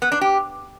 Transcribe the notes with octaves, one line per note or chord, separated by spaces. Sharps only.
B3
D4
G4